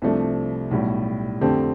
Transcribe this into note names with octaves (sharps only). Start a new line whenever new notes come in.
C2 C3 F3 A3 D4
B1 A2 G3
F2 D3 A3 C4 G4